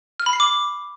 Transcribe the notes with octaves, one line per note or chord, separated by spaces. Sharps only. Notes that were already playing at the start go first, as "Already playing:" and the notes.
F6
B5
C7
D6